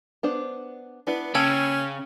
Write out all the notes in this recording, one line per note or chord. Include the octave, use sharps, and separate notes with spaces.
B3 D4 C5
B3 D4 E4 B4
C#3 A#3 C#4 G5 A5 E6 G#6